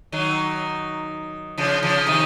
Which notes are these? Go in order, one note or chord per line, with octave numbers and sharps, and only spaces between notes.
D#3 F#3
C#3 F3
C#3 F3
C3 D#3